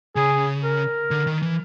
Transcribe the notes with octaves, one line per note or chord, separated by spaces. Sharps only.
C#3 G#4
A#4
D3
D#3
E3